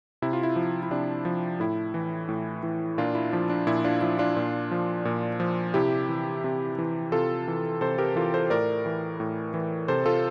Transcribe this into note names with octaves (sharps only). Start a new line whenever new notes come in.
C3 E4
F4
E4
F3
E4
C3 D4
F3
A2 E4
E3
A2
E3
A#2 D4 F4
E4
F3 D4
D4
A#2 E4
D4 F4
F3 E4
D4 F4
A#2
F3
A#2
F3
C3 E4 G4
E3
C3
E3
C3 F4 A4
E3
C3 A4 C5
G4 A#4
E3 F4 A4
A4 C5
A2 A#4 D5
E3
A2
E3
C3 A4 C5
F4 A4